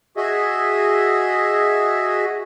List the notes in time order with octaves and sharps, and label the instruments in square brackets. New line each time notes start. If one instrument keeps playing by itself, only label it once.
[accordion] F#4 G#4 D#5 E5